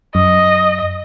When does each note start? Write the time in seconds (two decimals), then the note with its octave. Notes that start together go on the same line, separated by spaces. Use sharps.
0.15 F#2 D#5